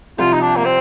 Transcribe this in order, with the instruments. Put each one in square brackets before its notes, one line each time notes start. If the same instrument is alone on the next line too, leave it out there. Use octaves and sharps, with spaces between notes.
[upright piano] C2 C3 F3 [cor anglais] F4
[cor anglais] D#4
D4
A#3
C4